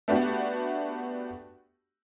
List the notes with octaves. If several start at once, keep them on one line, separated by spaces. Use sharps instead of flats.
A3 B3 D4 F#4 G4